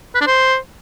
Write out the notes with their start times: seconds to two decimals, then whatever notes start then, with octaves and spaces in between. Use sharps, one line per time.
0.15 B4
0.21 D4
0.27 C5